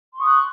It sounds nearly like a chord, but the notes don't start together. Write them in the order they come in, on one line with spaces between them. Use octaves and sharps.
C6 C#6 D#6 F#6